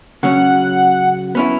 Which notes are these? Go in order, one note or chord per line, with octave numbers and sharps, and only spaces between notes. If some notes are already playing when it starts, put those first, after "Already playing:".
C#3 F#3 C#4 F#5
B3 C#4 E4